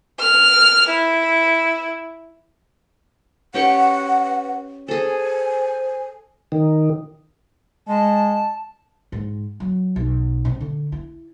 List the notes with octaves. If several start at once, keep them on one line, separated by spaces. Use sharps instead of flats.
F6
E4
C#4 G4 B4 F#5 C#6
G#4 A4 C5 G#5
D#3
G#3 A5
G#2
F#3
B1
C3
D3
E4